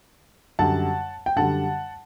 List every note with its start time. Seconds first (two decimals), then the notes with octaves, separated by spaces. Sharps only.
0.59 F#2 D3 G3 F#5 A5
1.26 G5
1.36 F#2 D3 G3 F#5 A5